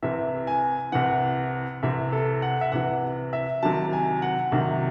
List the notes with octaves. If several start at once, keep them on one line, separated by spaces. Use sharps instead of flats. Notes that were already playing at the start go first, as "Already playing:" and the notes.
C2 C3 E3 E5
G#5
C2 C3 E3 F#5
C2 C3 E3 E5
A4
F#5
E5
C2 C3 E3 F#5
E5
C2 C3 D#3 F#3 A5
G#5
F#5
C2 C3 D#3 F#3